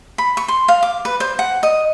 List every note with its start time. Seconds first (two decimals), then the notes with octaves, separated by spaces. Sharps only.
0.18 B5
0.37 C#6
0.48 C6
0.68 F5
0.83 D6
1.05 B4
1.20 C5
1.39 F#5
1.63 D#5